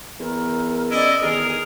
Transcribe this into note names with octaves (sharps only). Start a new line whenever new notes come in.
E2 A#4
C#4 E4 D5 D#5
E2 D#3 G#4 A#4